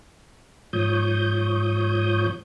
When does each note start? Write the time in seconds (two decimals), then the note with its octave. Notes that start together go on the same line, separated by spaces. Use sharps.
0.73 G#2 F3 C#5 D#6 G6